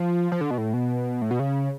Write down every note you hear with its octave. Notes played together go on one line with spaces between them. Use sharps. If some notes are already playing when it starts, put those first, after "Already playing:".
Already playing: F3
F3
D3
B2
A2
B2
A2
B2
C#3